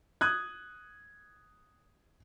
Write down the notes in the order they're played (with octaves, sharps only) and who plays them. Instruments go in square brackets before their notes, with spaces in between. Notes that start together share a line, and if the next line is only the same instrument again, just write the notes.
[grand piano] D#6 F#6 G#6